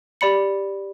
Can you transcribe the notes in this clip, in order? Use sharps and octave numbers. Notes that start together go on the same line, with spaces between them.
G4 D5 B5 C#7